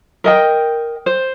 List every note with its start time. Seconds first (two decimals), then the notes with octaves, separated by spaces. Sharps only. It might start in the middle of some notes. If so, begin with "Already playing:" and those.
0.24 A#4 D#5 G5
1.06 C5